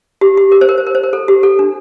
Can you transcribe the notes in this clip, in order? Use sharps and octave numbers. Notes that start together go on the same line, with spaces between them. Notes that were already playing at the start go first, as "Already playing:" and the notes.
G4
G4
A#4
C5
A#4
C5
A#4
C5
A#4
A4
G4
A4
D4